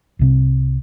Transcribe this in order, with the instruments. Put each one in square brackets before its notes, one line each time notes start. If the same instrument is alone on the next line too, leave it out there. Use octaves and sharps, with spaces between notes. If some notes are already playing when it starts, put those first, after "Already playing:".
[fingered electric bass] C2 C3 C4